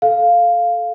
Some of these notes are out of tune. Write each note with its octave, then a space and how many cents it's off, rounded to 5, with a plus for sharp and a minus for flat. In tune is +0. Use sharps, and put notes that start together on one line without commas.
A4 -15 F5 +0